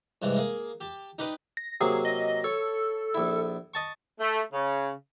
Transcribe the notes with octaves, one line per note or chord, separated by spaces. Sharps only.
G2 C3 E3 G#3
A#3 G#4
G4 A5
D#4 G4 B4 D5 D#5
A#6
C3 F#3 A#3 G#4
D#5
A4 C#5
A#1 E4
D#5 A5 C#6
A3
C#3